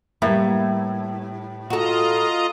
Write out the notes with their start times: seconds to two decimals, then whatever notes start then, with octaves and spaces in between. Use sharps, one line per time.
0.22 A2 G3 A#3 B4 E5
1.70 F4 F#4 A4 D#5 A#5